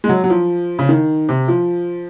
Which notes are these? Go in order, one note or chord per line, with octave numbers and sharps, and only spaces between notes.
G#3
F#3
F#3
F3
C#3
D#3
C3
F3